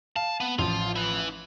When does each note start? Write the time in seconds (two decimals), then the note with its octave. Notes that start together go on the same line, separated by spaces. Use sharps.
0.16 F5 A5
0.40 B3
0.59 A1 F3 F4
0.96 E4 B4